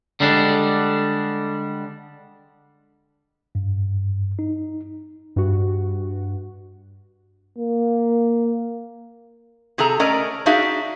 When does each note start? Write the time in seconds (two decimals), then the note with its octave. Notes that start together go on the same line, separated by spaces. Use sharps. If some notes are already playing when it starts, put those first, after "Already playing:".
0.20 D3 G3 G#3 D4
3.55 G2
4.39 D#4
5.36 G2 F#4
7.58 A#3
9.78 C3 G#4 A4 A5 A#5
9.99 A3 C#4 A#4 D5 D#5
10.46 D4 D#4 F#4 G#4 E5 F5